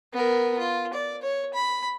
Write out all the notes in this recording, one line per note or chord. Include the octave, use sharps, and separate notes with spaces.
B3 A#4
F4
D5
C#5
B5